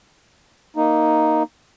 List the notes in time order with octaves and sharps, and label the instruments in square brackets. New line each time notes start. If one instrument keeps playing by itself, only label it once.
[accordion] A#3 D#4